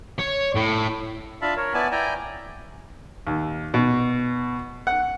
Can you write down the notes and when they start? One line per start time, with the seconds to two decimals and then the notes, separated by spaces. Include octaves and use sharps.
0.19 C#5
0.55 A2
1.42 D4 F4 E5 F5 A5 B5
1.57 A#4 C#5
1.74 B3 E4 D5 G#5 A5
1.92 E4 D5 G5 G#5 A#5
3.27 D#2
3.74 B2
4.87 F#5